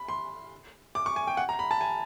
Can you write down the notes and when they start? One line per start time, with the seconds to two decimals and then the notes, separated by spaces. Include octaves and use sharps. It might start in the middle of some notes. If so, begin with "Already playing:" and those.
Already playing: B5
0.08 C6
0.95 D6
1.06 C#6
1.16 G#5
1.27 G5
1.37 F#5
1.49 A#5
1.59 B5
1.71 A5
1.81 G#5